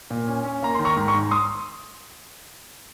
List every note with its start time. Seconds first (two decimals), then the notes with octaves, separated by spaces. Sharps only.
0.11 A#2
0.28 C#4
0.44 C#4
0.63 A#3 A#5
0.75 D#3 C6
0.85 A#5 C#6
0.96 G#2
1.08 A#5 C#6
1.14 G#2
1.31 C6 D#6